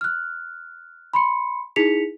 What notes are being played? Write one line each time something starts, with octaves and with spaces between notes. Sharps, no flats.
F6 F#6
B5 C6 C#7
D#4 E4 G#4 B6 C#7 F7